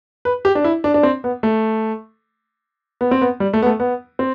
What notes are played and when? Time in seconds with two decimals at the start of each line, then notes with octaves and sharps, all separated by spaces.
0.25 B4
0.45 G4
0.55 D4
0.64 E4
0.84 D4
0.94 D4
1.03 C4
1.24 B3
1.43 A3
3.01 B3
3.11 C4
3.22 B3
3.40 G3
3.53 A3
3.62 B3
3.66 A3
3.80 B3
4.19 C4